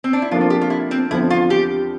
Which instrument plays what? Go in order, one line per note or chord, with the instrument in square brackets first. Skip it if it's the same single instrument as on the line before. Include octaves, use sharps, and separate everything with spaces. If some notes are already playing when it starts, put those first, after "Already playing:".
[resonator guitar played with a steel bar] C4
D4
E4
[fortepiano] C3 F3 A#3 D4 A4 [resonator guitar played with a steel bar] F4
[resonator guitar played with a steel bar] F4
G4
F4
E4
C4
[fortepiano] E2 D3 F3 C4 [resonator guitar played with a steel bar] E4
[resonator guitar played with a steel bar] F4
G4